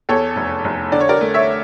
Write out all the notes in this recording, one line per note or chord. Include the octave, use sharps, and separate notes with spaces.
E2 A4 C#5
F1
F1
D3 D5
C#5
A#4 D5
A3
C#5 E5